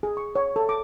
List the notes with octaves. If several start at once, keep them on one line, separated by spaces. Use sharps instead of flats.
G#4
C#6
C#5
A4
D6